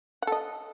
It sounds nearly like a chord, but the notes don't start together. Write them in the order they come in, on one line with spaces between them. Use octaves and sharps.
F#5 A4 D#5